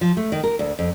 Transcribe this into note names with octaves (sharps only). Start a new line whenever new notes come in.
F3
A3
D#3
A#4
D2
F2